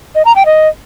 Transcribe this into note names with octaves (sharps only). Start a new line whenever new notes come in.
D#5
A#5
G5
D#5